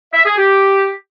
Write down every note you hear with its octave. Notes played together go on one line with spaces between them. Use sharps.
E5
G#4
G4